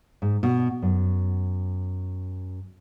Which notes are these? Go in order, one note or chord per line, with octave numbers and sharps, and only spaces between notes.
G#2
B2
F#2